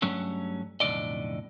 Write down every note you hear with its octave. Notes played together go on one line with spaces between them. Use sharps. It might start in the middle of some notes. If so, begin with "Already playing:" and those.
G2 F#3 A3 C#4
B1 F2 A2 D3 D5 D#5